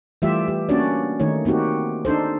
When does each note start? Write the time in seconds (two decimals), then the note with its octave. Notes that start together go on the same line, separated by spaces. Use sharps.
0.22 E3 G3 A3 F4 G4 E5
0.48 G4
0.69 A#3 C#4 D4 F#4 C#5 D5
1.20 D#3 A3 D#4 C#5
1.45 A#3 C4 D#4 F#4 G4
2.05 D4 D#4 A4 C5